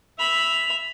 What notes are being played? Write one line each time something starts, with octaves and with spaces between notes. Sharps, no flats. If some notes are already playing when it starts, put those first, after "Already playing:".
E5 B5 F7